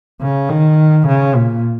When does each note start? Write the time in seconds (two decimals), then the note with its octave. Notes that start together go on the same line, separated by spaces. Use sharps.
0.21 C#3
0.49 D#3
1.07 C#3
1.36 A#2